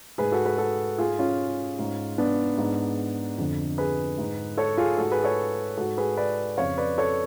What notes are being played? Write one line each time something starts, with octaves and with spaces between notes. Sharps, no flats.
G#2 G#4 B4
F#4 A4
G#4 B4
F#4 A4
G#2 F4 G#4
C#4 F4
G#2
B3 D4
G#2
F2 D3
G#4 B4
G#2
A4 C#5
F4 G#4
G#2 F#4 A4
G#4 B4
A4 C#5
G#2 F#4 A4
G#4 B4
B4 D5
F2 C#3 C#5 F5
B4 D5
A4 C#5